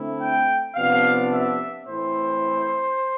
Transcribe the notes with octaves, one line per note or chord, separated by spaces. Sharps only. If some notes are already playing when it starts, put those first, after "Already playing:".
Already playing: D3 A3 C4 E4
G5
C3 F3 B3 D4 F5
E5
A2 E3 A3 C4 E4 C5